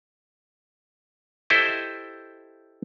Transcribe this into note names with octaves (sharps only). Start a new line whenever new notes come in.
E4 G4 A4 C5 D#5 E5